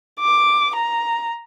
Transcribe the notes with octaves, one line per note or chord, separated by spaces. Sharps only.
D6
A#5